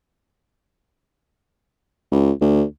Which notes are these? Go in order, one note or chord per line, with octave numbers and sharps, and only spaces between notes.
C#2
D2